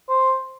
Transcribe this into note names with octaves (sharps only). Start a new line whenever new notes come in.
C5